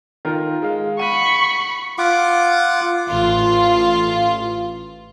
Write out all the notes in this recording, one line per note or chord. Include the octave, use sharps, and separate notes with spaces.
D#3 F4 A#4
G#3 F5
F#5 B5 C#6 D#7
F4 F#5 D6
A1 F4